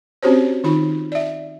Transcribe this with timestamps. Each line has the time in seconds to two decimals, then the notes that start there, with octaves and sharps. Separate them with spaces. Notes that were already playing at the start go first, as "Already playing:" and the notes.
0.23 C4 C#4 F#4 G4 C5 C#5
0.64 D#3 D#4 F4 B5
1.12 D5 E5